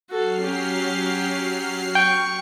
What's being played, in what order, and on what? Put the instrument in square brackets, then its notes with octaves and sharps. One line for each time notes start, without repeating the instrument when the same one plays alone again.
[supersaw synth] F#3 F6 C7 [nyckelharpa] F#4 A4
[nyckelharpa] C#4 G4
[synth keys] G5 [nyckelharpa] C#6